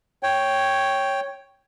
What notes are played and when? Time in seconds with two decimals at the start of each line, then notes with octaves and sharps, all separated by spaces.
0.23 C#5 G5